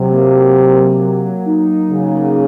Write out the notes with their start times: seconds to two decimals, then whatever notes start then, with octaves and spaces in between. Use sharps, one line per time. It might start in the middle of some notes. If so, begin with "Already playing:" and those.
Already playing: C3 F#3
0.11 A#3
0.33 F#3
0.56 A#3
0.78 F#3
1.00 F#3
1.24 F#3
1.46 D#4
1.68 D#4
1.91 C#3 F#3
2.13 A#3